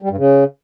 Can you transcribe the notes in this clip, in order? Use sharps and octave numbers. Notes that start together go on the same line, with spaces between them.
G3
G2
C#3